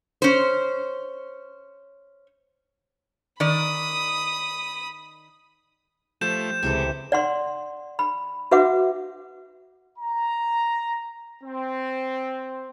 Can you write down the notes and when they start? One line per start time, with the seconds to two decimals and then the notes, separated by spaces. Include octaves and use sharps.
0.22 C#4 C5
3.40 D#3 D5 B5 D#6
6.21 F3 A3 G4 C5 G6 E7
6.63 C#2 C3 E3 G#3 A4
7.12 D5 F#5 C6
7.99 B5
8.51 F#4 B4 E5 F#5 D6
9.98 A#5
11.42 C4